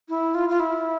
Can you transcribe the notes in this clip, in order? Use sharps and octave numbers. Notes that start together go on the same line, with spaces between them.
E4
F4
F4
E4